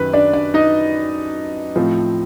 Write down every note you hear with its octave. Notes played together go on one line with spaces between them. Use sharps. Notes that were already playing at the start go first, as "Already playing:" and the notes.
Already playing: F#2 D#3 F#3 B4
D4 D5
D4 D5
D#4 D#5
A2 F3 A3 C4